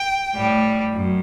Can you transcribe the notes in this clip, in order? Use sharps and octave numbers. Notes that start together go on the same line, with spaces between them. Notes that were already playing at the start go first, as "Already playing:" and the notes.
Already playing: G5
A2 G3
F#2